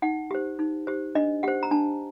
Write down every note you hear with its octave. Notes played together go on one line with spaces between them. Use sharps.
D#4 F#5
G4 C5
D#4
G4 C5
D4 D#5
G4 C5 F#5
A#5
D4 A5